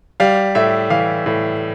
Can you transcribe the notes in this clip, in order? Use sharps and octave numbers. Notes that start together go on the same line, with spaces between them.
G3 F5
A2 E5
E3 F5
A2